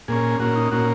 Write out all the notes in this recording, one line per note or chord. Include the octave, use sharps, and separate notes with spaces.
A#2 A#3 C#4 G#4
A#2 A#3 C#4 F#4
D#4
A#2 A#3 C#4 F#4